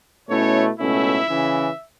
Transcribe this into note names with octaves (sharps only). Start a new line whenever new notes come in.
B2 A3 C#4 E4 C#5
C#2 B2 A3 C#4 E4 E5
C#3 E3 C#4 E4